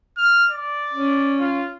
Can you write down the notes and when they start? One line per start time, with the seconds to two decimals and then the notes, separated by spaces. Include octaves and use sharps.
0.17 F6
0.50 D5
0.94 C#4
1.39 F4